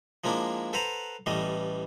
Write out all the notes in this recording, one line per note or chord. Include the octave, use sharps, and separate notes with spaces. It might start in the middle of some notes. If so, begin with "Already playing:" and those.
F3 G#3 A#3 D4 E4
A4 B4 C5 F#5 A#5
A1 E3 G3 A3 D#5